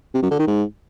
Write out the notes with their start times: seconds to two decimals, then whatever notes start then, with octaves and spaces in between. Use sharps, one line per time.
0.14 C3
0.22 F#2
0.31 D3
0.39 D#3
0.47 G#2